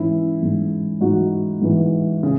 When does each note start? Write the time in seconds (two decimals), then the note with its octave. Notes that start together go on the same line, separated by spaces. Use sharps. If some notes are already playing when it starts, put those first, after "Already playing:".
Already playing: G#2 E3 C#4 E4
0.40 G#2 E3
1.01 G#2 E3 D#4 F#4
1.61 G#2 E3
2.23 C#3